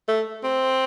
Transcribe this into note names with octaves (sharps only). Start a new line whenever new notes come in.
A3
C4